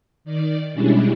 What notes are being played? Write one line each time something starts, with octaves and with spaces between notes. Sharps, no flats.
D#3 D5
B2 G3 G#3 C#4 D4 E4